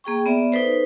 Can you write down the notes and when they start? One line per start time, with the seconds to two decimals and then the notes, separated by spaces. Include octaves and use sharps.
0.04 A#3 G#4 G5 C#6
0.26 B3 D5 E5
0.52 D#4 A4 B4 C5